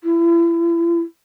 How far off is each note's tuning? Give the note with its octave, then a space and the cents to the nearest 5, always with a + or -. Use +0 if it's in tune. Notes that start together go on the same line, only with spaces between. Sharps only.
E4 +35